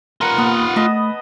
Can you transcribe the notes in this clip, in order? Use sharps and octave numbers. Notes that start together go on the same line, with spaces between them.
F4 A#4 B4 F#5
A#3 B3
A3 D#5 A5 B5